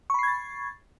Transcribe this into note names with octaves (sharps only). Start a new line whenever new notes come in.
B5 C#6 G#6 A6 C7